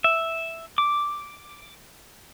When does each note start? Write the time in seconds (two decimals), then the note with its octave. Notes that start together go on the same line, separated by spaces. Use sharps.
0.04 E5
0.78 D6